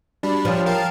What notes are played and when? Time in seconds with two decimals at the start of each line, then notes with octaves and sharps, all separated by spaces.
0.23 G3 D4 F#4 B5
0.45 F3 G4 C#5 G5
0.66 A#4 F5 G5 A5